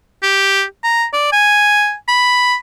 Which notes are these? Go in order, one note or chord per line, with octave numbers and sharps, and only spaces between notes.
G4
A#5
D5
G#5
B5